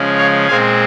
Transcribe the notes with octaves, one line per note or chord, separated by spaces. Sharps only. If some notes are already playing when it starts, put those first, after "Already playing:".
Already playing: C#3 F3 G#3 C#4
C#5 F5
A#2 G#3 C4 F5 G#5